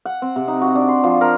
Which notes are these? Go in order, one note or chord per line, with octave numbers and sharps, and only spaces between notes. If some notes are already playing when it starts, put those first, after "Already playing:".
F#5
C4
C3
D#4
F#4
D4
C6
F3
A#4